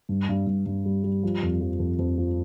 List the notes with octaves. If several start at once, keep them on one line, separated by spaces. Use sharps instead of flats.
G2
G2
G2
G2
G3
G3
F3
F2
F3
F2
F2
F3